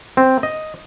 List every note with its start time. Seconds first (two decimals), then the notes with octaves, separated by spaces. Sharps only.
0.17 C4
0.43 D#5